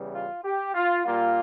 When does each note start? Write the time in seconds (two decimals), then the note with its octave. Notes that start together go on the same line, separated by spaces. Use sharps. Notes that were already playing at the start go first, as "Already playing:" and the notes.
Already playing: E2 C#3 E3 G3
0.13 F4
0.44 G4
0.75 F4
1.05 A#2 G3 A#3 F4